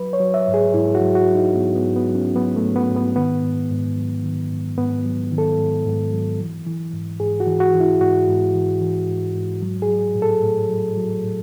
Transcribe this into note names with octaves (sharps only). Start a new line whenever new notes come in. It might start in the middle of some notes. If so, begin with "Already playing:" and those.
Already playing: F#3 B4
C#5
F#3
E5
G#2
G#4
G#2 E4
F#4
F#3
F#4
F#3
D#4
G#2 B3
B3
G#2
B3
F#3
C#4
F#3 B3
A3
G#2
B3
G#2
B3
D#3 B3
G#2
G#2
F#3
D#3
G#2
G#2 B3
F#3
D#3
A4
G#2
G#2
F#3
E3
E3
G#2
G#2 G#4
F#4
E3
F#4
E3
E4
G#2 F#4
G#2
E3
E3
G#2
G#2
F#3
G#4
F#3
A2
A4
A2
F#3
F#3
A2